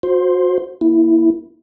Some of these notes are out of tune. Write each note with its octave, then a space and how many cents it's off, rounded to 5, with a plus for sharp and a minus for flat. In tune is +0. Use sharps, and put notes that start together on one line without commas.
F#4 -30 C5 +5 C6 +0
A#3 +20 E4 +0